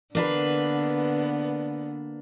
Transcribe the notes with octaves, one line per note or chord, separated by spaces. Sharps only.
D3 A#3 B3 D4 B4